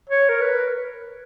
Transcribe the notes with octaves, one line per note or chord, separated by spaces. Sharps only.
C#5
A#4
B4